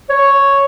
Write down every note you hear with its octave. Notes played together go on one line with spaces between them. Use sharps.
C#5